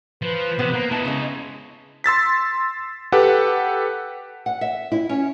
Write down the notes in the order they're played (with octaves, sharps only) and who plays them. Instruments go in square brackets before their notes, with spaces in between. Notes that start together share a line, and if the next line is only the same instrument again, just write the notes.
[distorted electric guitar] F3 [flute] B4
[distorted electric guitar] C3 [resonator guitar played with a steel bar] B3
[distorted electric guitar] A#3
[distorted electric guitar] E4 D#5 [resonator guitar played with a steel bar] A5
[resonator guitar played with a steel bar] C#3 G#3
[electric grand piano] C6 E6 A6 B6
G4 A4 B4 F#5
[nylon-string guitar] F#5
E5
E4
C#4